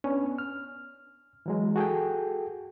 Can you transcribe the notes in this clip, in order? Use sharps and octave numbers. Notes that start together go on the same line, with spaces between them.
B3 C#4 D4
F6
E3 F#3 G#3
F#4 G#4 A4 G5